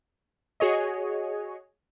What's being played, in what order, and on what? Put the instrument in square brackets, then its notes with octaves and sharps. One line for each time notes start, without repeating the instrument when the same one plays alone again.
[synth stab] F#4 G#4 C#5 D#5